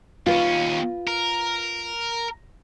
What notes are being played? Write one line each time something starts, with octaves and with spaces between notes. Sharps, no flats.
D#2 C#4 F4 B4
A#4